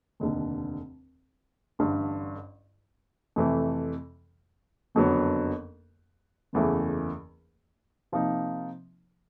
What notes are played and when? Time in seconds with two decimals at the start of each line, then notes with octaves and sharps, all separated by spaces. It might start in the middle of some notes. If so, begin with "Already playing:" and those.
0.20 F1 D#2 D3
1.79 A1 G2 D3
3.36 F2 C3 E3 A3
4.95 F#1 F2 D3 F#3 B3
6.53 F#1 E2 C#3 E3 A3
8.12 C3 F3 A#3 D#4